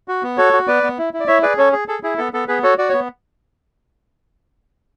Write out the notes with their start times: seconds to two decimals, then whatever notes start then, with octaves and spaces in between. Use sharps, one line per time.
0.08 F#4
0.23 B3
0.37 F#4 A4 C#5
0.53 F#4
0.68 B3 B4 D5
0.83 B3
0.98 E4
1.13 E4
1.20 D5
1.27 E4 C#5 E5
1.42 G#4 B4 D5
1.57 C#4 A4 C#5
1.72 G#4
1.88 G#4 A4
2.03 E4 G#4
2.18 B3 A4
2.33 B3 A4
2.48 B3 G#4 B4
2.63 F#4 A4 C#5
2.78 F#4 D5
2.89 B3 C#5